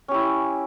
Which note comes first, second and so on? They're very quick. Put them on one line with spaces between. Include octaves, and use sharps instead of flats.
C#4 G4 E4